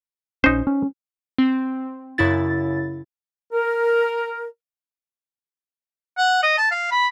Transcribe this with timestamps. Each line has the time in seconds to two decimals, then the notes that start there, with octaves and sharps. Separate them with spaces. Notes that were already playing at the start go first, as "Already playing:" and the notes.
0.44 A#1 C#4 D#4 C5
0.67 C#4
1.38 C4
2.18 F#2 C#3 E4 A6
3.53 A#4
6.18 F#5
6.43 D#5
6.58 A5
6.71 F5
6.91 B5